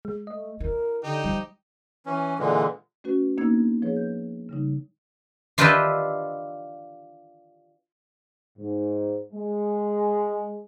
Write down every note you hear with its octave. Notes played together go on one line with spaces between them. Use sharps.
G#3
A3 D#5
E4 A#4
D3 D#4 G4
F3 G3
E3 C#4
A#2 D3 E3 G#3
A3 C#4 F#4 B4
A#3 B3 D4 D#4 E6 G#6
F3 G#4 B4 C#5
G6
C#3 G3 D#4
D4 F4 G4 B4 D#5 E5
G#2
G#3